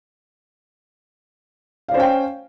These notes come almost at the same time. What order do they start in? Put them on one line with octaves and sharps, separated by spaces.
F5 D5 C5 C#4 G5